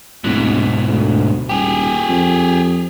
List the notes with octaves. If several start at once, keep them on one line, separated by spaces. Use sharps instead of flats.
D1 G#2 B2
D2
D#1 G4 G#4
F2